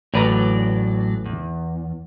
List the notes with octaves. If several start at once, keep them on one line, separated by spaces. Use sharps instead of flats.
A1 A2 F#3 B4 D5 A#5
E2